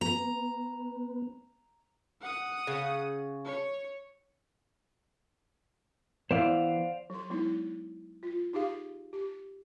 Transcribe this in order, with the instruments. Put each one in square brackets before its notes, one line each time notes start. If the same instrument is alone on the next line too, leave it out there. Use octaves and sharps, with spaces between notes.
[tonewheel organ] B3 [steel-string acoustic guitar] A#5
[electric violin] F#5 D#6
[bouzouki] C#3
[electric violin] C#5
[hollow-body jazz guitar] E3 B3 [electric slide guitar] C5 D5 F5
[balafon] F#3 C6
F#3 G#3 B3 D#4 E4
F4
D#4 G4 G#4 F5
G4